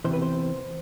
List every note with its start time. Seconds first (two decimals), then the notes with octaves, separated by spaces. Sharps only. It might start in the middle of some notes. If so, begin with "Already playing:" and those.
0.04 E2 C3 E3 C5
0.13 B4
0.22 C5